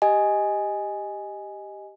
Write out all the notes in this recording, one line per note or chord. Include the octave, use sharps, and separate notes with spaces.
G4 D#5 G#5